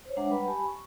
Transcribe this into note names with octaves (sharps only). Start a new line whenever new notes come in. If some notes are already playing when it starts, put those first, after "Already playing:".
C5 C#5
G#3 D4 E5 F#5 A#5 D6
G3 B4 F#5 B5
G4 G#5 A5 B5
C#6